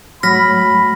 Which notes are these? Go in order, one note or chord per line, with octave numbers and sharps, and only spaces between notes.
G#2 F#3 A3 B5 F6 A#6 B6